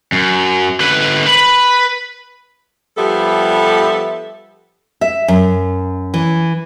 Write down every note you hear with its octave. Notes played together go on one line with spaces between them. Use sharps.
F#2
D3 B4
B4 B5
F3 G3 B3 G4 A4 E5
E5
F#2
E3